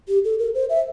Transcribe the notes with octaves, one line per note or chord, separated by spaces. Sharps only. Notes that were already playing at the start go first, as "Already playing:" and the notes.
G4
A4
A#4
C5
E5